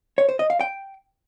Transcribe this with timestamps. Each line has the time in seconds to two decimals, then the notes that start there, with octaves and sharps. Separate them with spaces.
0.18 C#5
0.29 C5
0.39 D#5
0.50 F5
0.61 G5